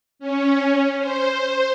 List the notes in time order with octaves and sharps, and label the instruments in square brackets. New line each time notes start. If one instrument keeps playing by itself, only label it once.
[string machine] C#4
C5